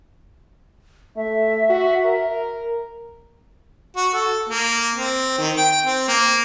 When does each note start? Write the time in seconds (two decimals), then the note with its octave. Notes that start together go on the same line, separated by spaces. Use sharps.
1.16 A3 E5
1.70 F#4
2.05 A#4
3.96 F#4
4.14 A4
4.49 A#3
4.95 C4
5.38 D#3
5.57 G5
5.85 C4
6.08 A#3